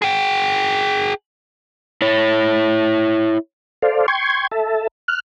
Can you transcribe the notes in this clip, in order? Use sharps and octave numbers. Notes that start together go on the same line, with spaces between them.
G#4 G5
E4 C#5
A4 C5 D5 F5
G5 C6 C#6 G#6
A4 E5 A5
F6 F#6